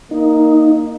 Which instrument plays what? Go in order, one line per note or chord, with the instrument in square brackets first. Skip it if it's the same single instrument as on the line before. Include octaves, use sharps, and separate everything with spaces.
[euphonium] A#3 [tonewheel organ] D#4